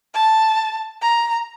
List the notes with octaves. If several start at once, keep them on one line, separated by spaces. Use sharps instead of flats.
A5
A#5